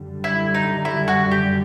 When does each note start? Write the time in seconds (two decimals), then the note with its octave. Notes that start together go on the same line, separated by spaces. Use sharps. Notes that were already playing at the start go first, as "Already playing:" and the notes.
Already playing: F#2 D3 G3
0.24 E4
0.54 D#4
0.85 E4
1.08 F#4
1.31 G4